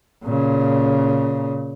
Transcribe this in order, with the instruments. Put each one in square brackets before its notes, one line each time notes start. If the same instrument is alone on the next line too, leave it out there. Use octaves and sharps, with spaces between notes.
[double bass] A#2 C#3